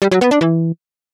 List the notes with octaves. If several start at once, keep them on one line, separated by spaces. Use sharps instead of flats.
G3
F#3
B3
D4
E3